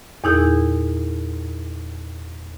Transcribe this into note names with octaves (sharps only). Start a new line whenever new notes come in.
E2 A#2 D#4 E4 G#4 G6